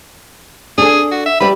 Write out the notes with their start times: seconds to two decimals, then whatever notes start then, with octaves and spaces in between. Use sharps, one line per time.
0.78 D4 G#4 A4
1.12 F#4
1.26 E5
1.40 G3 G4 B4 D5